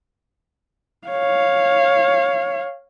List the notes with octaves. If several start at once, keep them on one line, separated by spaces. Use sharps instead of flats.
C#5 F5